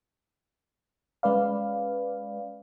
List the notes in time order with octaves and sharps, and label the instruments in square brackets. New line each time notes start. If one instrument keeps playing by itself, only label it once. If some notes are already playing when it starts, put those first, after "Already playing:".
[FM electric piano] G#3 C#4 B4 D5 F5